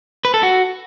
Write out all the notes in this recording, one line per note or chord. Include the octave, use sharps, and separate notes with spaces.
B4
A4
F#4